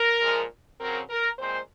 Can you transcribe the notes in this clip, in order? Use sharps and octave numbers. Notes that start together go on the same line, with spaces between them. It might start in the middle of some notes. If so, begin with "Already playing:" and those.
Already playing: A#4
A#2 F3 G#3
C#3 F#3 C4 A#4
A#4
A#2 G#3 C4 C5